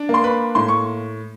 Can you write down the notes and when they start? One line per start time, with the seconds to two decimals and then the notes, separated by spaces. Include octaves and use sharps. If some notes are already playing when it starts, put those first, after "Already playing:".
Already playing: D4
0.09 A#3
0.14 C6
0.24 B4 B5
0.55 A2 C6
0.68 C#6